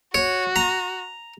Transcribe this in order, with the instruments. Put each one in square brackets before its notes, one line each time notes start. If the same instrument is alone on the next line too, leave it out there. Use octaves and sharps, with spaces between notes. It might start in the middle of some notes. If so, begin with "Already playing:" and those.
[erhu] F#4 [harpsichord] C#5
[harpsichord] A#5